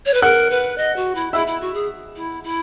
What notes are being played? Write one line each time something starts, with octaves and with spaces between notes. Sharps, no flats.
C#5
B4
A#4 F#5 F#6
B4
D#5
F#4
E4
E4 E5 E6
E4
F#4
G#4
E4
E4